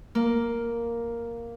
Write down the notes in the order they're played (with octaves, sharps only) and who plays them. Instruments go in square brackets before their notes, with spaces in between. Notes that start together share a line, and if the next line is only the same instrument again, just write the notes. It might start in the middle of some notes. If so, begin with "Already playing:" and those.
[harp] A#3